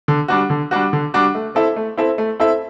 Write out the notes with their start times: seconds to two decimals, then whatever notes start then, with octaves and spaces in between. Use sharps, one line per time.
0.08 D3
0.28 G3 D4 F#4
0.50 D3
0.71 G3 D4 F#4
0.93 D3
1.14 G3 D4 F#4
1.35 A3
1.55 C4 E4 A4 E5
1.76 A3
1.97 C4 E4 A4 E5
2.18 A3
2.40 C4 E4 A4 E5